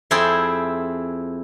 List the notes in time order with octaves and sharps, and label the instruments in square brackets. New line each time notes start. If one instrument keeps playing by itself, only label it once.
[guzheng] F2 C4 E4 G#4 G5 A5